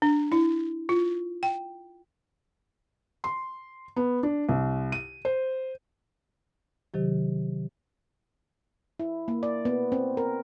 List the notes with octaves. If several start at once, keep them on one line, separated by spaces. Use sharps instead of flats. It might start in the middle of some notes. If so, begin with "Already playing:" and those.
D4
E4
F4
G5
C6
B3
D4
C2
D#7
C5
C3 D#3 F#3 G4
E4
A#3
D5
B3
C4
A#4